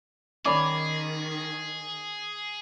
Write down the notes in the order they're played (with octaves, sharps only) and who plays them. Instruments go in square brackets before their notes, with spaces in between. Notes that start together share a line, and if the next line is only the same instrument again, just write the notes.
[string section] D#3 [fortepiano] C#4 D5 [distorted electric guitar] G#4 [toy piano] B5 D6